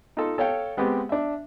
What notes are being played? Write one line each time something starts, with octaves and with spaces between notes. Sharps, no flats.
D#4 F4 A4
A4 C#5 F5 G5
G#3 B3 C4 G4
D4 E5